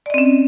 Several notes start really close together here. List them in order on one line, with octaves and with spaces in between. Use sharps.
D5 D#5 C4 C#4